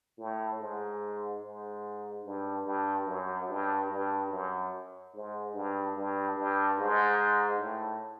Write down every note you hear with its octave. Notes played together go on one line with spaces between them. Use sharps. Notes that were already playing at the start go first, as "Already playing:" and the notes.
A2
G#2
G#2
G2
G2
F#2
G2
G2
F#2
G#2
G2
G2
G2
G#2
A2